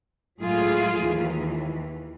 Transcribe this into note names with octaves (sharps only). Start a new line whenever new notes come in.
A2 F#3 G#3 F4 G#4
D#2 E3